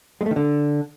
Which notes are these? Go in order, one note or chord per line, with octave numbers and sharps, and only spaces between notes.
G#3
A3
D#3
D3